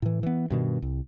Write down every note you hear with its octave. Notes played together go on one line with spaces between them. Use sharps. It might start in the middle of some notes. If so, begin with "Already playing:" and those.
A2 E3
E3 B3
G2 B2 D#3
C2